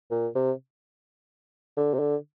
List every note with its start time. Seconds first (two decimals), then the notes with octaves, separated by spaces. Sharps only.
0.11 A#2
0.35 C3
1.77 D3
1.94 C3
1.99 D3